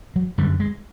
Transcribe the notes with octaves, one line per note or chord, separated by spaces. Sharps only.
F#3
F#2 D3 G3
G#3